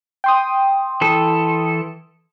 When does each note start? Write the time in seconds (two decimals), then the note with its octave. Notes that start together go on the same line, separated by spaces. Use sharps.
0.24 G5 C6 D#6
1.01 E3 A4